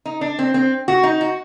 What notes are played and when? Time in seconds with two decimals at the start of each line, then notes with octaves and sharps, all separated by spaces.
0.05 D#4
0.21 D4
0.39 C4
0.54 C4
0.88 F#4
1.03 D#4
1.21 F#4